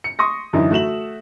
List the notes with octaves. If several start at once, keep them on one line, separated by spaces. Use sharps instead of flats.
C#7
C6 C#6 D#6 A#6
F#2 D3 E3 D#4 E4
A3 F#4 E5 E7 F#7